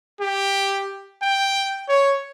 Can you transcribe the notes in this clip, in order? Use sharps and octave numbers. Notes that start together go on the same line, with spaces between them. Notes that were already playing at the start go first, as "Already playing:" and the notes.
G4
G5
C#5